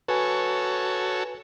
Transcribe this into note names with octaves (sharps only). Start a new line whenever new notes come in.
F#4 A4 B4 C#5 G#5